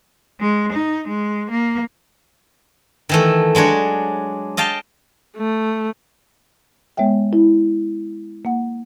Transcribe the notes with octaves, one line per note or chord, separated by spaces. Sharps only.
G#3
D#4
G#3
A#3
D#3 E3 A3
F#3 G#3 D4 C#5
D#5 F5 G5 A5
A3
G#3 B3 C#5 E5 G5
E4
A#3 F#5